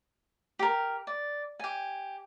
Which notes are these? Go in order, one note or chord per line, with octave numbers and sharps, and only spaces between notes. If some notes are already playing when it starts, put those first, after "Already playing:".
G4 A#4
D5
G4 G#5